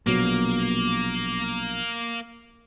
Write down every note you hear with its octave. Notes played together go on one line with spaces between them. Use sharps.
A#1 B2 F#3 A#3